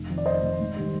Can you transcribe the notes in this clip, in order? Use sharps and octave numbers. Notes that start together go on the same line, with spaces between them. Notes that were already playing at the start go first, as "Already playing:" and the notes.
Already playing: F1
F2 D#3
D5
F1 C5 D#5
F2 D#3
G#2
D#3 G3